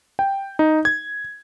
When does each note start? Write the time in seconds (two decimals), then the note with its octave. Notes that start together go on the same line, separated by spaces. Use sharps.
0.19 G5
0.59 D#4
0.85 G#6